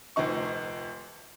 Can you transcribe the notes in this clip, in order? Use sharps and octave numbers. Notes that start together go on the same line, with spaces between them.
F1 D2 F3 D#4 C#6